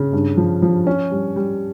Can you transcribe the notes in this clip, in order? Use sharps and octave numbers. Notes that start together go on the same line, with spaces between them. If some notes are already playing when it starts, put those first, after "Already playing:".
Already playing: C#3
G2
F3
F3
C#4
G3
G3